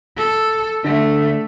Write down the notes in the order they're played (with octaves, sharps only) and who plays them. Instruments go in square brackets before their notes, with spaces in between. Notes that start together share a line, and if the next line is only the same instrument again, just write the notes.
[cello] A4
[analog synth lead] D3 [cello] A3